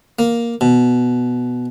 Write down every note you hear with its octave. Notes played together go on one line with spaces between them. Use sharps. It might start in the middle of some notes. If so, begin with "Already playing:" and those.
A#3
B2